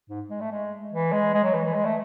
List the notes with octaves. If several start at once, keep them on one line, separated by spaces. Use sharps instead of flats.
G#2
G#3
A3
G#3
E3
G#3
G#3
F#3
E3
E3
G#3
A3